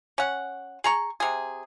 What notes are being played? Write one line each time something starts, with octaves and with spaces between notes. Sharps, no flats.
C#4 F#5
G#4 A#5 C#6
C3 G#4